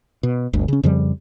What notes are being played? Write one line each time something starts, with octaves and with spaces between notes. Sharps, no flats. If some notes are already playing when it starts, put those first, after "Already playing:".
B2
G1 D2
C#3 C#4
F2 C#3 F3 G3